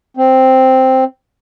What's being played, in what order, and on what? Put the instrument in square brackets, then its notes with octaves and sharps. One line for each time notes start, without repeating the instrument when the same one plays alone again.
[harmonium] C4